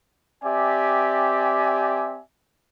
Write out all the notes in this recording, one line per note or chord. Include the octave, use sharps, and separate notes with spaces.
C4 G4 D5 E5 G#5